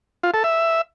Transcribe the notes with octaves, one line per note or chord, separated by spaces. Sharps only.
F4
A4
E5